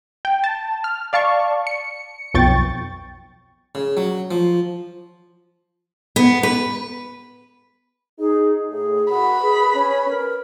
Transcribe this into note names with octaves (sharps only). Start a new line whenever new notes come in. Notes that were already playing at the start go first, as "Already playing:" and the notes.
G5
A5
F6
D5 F5 A5 C#6
C#7
B1 F2 G5 C#6 A6
C#3
F#3
F3
B3
B4
D#4 G#4
A2 G#4
F#4 A#4 F#5 B5
G#4 B4
C#4
A#4